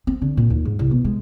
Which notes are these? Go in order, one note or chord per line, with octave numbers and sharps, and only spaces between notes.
C4
D3
A#2
D#2
G#2
C2
B2
G#3